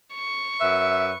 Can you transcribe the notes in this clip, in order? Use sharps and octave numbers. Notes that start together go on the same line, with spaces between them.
C#6
F#2 B4 E5